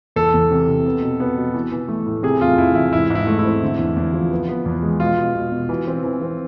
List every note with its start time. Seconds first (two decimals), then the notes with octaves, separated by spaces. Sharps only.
0.16 E2 A4
0.34 E2
0.51 C3
0.68 C3
0.86 B3
1.02 B2
1.20 B3
1.37 B2
1.54 E3
1.72 E3
1.88 A3
2.06 A2
2.23 C3 G#4
2.41 E2 F4
2.58 E2 E4
2.75 E2 E4
2.93 G#2 E4
3.10 G#2
3.15 E4
3.27 A3
3.39 E4
3.45 C4
3.63 D3
3.79 E2
3.96 E2
4.13 F3
4.31 B3
4.49 B3
4.66 E2
4.83 G#3
5.00 B2 F4
5.18 B2
5.34 B2
5.52 B2
5.69 E3
5.87 C4
6.04 E3
6.22 C4